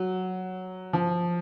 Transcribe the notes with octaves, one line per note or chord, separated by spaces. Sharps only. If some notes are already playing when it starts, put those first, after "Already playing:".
Already playing: F#3
F3